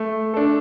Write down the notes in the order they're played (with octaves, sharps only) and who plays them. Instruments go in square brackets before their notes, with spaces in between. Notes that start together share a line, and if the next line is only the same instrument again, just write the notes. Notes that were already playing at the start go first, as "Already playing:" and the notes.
Already playing: [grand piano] A3
D4 A4